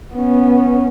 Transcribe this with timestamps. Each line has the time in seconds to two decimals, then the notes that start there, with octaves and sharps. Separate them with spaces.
0.14 B3 C#4